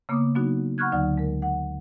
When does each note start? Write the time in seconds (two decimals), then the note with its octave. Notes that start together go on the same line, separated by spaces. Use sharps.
0.09 C#3 A#3 B3 D6 D#6
0.35 F#3 B3 D4 D#4 F#4
0.78 F#5 B5 C#6 F6 F#6 G#6
0.92 D2 D3 F#3 D#4 D5 F#5
1.18 G#3 A#4
1.42 F#5